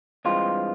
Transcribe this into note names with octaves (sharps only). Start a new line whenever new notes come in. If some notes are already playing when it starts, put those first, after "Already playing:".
G2 E3 G#3 C4 F4